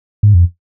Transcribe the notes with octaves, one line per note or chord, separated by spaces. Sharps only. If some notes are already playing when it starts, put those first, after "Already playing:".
G#2
F2